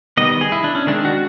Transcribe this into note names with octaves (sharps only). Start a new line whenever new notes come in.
D#3 G3 B3 D#5
G#4
E4
D4
C#4
D#3 G#3 C4 D4
F#4